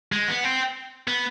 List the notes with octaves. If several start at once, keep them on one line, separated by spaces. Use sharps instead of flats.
G#3
B3
C4
B3